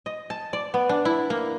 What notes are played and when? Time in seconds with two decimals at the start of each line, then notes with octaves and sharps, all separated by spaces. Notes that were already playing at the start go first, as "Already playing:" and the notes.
0.06 D#5
0.30 A5
0.53 D5
0.74 B3
0.89 D4
1.05 E4
1.30 A#3